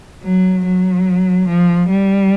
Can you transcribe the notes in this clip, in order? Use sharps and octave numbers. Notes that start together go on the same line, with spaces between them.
F#3
F#3
F3
G3